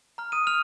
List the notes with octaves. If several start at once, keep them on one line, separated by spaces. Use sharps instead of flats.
A#5 F6
D#6 D#7
F6 F7